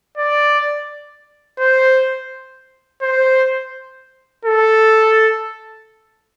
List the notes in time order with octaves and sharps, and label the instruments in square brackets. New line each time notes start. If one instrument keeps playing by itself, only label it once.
[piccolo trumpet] D5
C5
C5
A4